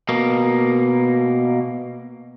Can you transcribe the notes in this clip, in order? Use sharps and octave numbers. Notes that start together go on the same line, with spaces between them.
B2 A#3